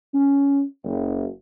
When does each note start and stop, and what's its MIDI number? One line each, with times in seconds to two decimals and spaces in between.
0.14 0.64 61
0.85 1.25 30